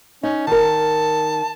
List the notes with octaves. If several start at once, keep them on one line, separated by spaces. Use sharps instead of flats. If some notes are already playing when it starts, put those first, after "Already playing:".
C#4 D#4
D#3 A#4 A5